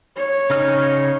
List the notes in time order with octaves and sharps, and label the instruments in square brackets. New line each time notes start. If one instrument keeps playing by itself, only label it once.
[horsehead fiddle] C#5
[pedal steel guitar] C#3 D#4 F6